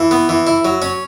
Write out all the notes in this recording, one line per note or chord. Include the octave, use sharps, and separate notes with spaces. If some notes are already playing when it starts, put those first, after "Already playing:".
Already playing: E3
B3
E3
E4
F#3
C#4